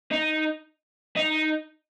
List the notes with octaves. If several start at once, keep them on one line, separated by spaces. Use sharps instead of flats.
D#4
D#4